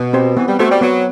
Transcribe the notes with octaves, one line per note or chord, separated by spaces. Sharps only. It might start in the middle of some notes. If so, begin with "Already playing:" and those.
Already playing: B2
C4 G4 C5
E3 B3
G3
A3 F#4 C5
G3
F#3 B3